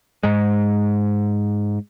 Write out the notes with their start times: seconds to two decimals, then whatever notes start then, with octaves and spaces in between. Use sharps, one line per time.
0.23 G#2 G#3